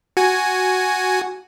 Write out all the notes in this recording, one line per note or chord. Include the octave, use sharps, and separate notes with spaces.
F#4 G#5